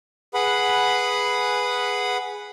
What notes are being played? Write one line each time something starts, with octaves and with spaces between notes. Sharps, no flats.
G#4 B4 F#5 B5